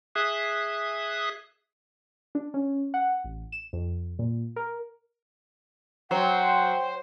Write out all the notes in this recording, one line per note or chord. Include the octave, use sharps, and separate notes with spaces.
G#4 E5 D#6 F#6
D4
C#4
F#5
A1
E7
F2
A#2
A#4
F#3 C5 F#5 G5